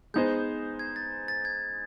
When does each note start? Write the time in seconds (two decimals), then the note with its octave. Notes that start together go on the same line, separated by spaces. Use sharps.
0.14 G#3 B3 D#4 G#4 C5 G6
0.79 G#6
0.96 A6
1.28 A6
1.45 G#6